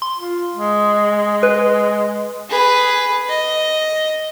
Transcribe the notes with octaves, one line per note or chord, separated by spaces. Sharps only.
C6
F4
G#3
B4
G#4 B4
D#5